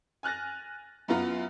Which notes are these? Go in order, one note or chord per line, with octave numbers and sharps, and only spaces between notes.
G#5 F6 F#6 A6 A#6
F#2 B3 F4 A#5